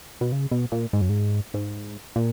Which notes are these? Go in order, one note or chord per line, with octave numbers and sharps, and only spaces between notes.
B2
C#3
B2
A#2
G#2
F#2
G#2
G#2
A#2